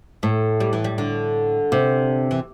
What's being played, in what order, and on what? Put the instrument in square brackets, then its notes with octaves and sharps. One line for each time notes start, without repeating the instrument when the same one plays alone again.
[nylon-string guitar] A2 [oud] A3
[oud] G3
E3
G3
D3
[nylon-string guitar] C3
[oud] E3